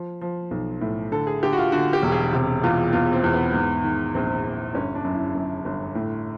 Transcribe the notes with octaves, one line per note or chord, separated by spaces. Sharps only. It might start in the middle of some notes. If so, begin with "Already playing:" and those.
Already playing: F3
F3
B1
A2
D3 A4
G#4
D3 G4
F#4
F4
D3 F#4
G4
E1
G#4
C3
E2 F4
E2 F4
C4
E2
B3
G#2
D#3
A#1 C4
A#1
G1 C#4
D4
F#2
E4
F#2
G1
A2